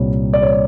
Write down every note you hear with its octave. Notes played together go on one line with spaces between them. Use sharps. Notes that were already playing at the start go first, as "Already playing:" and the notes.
Already playing: C2 A#2 G3 C#5
D5
C#5
D5